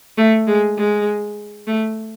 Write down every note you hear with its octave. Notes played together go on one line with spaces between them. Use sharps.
A3
G#3
G#3
A3